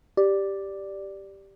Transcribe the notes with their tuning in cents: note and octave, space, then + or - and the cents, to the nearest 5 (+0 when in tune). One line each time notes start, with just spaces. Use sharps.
G4 +0 D5 +0